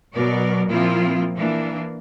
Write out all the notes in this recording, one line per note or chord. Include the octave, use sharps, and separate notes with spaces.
B2 F#3 A#4 D5
A#2 F3 A#3 C4 E4 F4
E3 A#3 D4